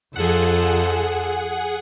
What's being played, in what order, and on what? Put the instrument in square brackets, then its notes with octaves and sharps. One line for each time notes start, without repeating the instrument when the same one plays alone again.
[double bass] F2 [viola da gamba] F3 A4 [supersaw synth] G#4 F#5